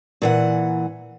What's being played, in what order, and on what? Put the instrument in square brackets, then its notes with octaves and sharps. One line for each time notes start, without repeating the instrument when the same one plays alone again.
[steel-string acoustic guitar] A#2 E3 F#5